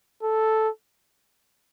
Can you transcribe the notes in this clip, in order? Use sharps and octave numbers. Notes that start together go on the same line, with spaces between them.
A4